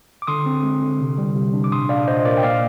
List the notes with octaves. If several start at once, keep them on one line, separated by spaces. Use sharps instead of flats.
D6
D3 C6 D#6
C4
G#3
D3
C3
G3
C3
D4
D6
A#2 C6 D#6
D4 D5 F5
A#2 C5 D#5
A#2 A#4 D5
G5
A#3 D5 F5